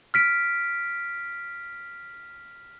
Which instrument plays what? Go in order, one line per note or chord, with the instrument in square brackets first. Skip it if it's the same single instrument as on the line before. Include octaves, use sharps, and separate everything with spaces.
[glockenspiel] F6 B6 D7